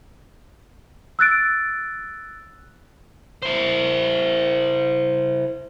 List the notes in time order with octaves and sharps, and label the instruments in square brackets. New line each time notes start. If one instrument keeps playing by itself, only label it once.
[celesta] E6 F#6 A6 D7
[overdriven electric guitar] E4 C5